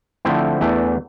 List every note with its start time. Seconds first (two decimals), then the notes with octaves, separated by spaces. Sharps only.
0.25 D3 F3 A3 C4 E4
0.61 E2 E3 A3 D4